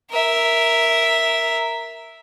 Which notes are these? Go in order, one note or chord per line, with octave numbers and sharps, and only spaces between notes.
A#4 E5